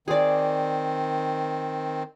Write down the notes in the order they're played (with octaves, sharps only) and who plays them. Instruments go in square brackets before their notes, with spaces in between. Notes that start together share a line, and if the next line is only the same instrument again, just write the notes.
[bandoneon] D#3 C4 [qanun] G#4 D5